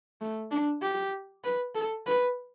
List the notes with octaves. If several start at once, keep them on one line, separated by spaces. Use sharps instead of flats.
A3
D4
G4
B4
A4
B4